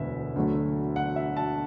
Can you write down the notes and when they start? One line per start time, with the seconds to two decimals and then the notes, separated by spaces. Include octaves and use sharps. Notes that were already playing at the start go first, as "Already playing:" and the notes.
Already playing: E1 D2 D3 B3 E5
0.36 D2 D3 F#3 A3
0.96 F#5
1.16 E5
1.37 A5